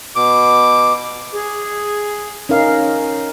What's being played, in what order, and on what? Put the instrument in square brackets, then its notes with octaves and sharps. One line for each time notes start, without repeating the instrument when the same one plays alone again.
[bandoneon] B2 D6
[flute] G#4
[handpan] C#4 D#4 A#4 F5